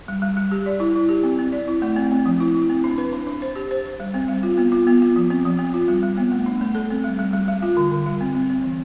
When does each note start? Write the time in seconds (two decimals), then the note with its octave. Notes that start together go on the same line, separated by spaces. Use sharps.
0.08 G3
0.22 G3
0.37 G3
0.51 G4
0.66 D5
0.80 E4
0.96 E4
1.09 G4
1.23 C4
1.39 C4
1.52 D5
1.68 E4
1.82 A3
1.96 C4
2.12 C4
2.26 F3
2.40 E4
2.54 E4
2.69 C4
2.84 D4
2.98 B4
3.13 D4
3.27 D4
3.42 C5
3.56 G4
3.71 C5
3.85 C5
4.00 G3
4.14 C4
4.28 G3
4.43 F4
4.58 B3
4.72 F4
4.87 B3
5.02 F4
5.16 F3
5.30 C4
5.45 F3
5.59 C4
5.74 F4
5.88 G3
6.03 G3
6.17 B3
6.32 A3
6.46 D4
6.61 A3
6.75 A4
6.90 C4
7.04 G3
7.19 G3
7.33 G3
7.48 G3
7.62 F4
7.77 D3
7.92 D3
8.06 G3
8.21 C4
8.35 C4
8.50 C4
8.64 E3